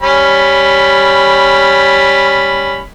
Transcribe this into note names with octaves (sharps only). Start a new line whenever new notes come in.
G3 C#4 B5